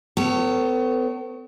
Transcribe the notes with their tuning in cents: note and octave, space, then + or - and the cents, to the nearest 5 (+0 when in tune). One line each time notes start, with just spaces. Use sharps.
B3 +45 A4 +40 C#5 +0